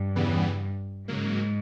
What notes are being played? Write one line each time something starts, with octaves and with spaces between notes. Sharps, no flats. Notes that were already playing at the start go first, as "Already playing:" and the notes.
Already playing: G2
E2 C#3 E3 G3 B3
G#2 C#3 F#3 A#3